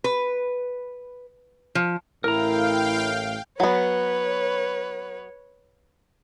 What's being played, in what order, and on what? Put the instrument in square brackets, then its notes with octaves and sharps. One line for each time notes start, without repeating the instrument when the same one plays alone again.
[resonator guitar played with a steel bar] B4
F3
[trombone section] A1 A2 [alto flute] E4 [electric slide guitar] A#4 A#5 [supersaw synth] F5 G5
[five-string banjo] F#3 B3 [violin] B4 C#5